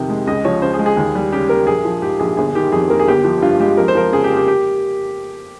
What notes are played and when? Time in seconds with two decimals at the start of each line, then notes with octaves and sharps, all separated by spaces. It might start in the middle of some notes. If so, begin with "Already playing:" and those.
Already playing: F2 C3 D#3 G5
0.10 G#3
0.27 C#2 D#5
0.45 F3 C#5
0.62 C#3 C5
0.74 G#4
0.79 G#3
0.86 G#4
0.97 D#2
1.15 G3
1.32 C#3 G4
1.49 A#3 A#4
1.67 A#1 G#4
1.85 F3
2.02 G#2 G4
2.20 A#1 G#4
2.37 G1 G#4
2.55 D#3 G4
2.72 F2 G#4
2.90 A#3 A#4
3.00 G#4
3.08 G1 G4
3.24 F3 G4
3.42 G2 F4
3.60 G#3 G4
3.77 F2 A#4
3.88 C5
3.95 F3 A#4
4.12 C#3 G#4
4.24 G4
4.30 A#3
4.37 G4
4.48 G4